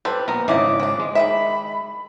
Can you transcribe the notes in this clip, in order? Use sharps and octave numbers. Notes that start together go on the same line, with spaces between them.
G3 A4 B4 C5
A#1 B3 A#4 A#5
G#1 G#2 C#3 E4 D5 D#5 D6
F3 D4
G#3
D#3 C#4 E5 B5